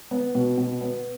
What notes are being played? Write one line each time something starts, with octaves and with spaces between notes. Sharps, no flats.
B3
B2
B2
B3